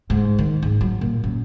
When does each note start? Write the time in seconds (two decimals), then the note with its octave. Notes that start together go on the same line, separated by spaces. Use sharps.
0.10 G#2
0.39 D#3
0.62 G#2
0.81 F#3
1.01 A#2
1.24 F#2